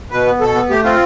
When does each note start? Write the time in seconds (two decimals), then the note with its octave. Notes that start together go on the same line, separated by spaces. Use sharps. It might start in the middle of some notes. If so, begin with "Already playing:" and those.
0.11 B2 B4
0.26 B3
0.41 B2 A4
0.54 B3
0.70 A3 G4
0.84 C4 F4